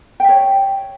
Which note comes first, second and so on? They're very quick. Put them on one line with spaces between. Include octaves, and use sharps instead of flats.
G5 E5 C#5